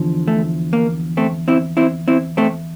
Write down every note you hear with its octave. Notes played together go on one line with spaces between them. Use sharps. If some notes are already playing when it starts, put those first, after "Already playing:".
Already playing: E2 D3 F3
A3
A#3
A3 C4
C4 E4
C4 E4
C4 E4
A3 C4